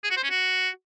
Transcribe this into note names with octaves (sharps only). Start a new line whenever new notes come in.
G#4
F#4
C5
C#4
F#4